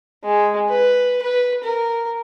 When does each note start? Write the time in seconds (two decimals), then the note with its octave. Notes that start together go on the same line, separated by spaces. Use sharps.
0.24 G#3
0.70 B4
1.22 B4
1.64 A#4